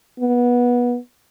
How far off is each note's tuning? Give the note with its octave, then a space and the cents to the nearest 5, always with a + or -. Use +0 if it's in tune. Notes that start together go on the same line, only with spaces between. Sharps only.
B3 -20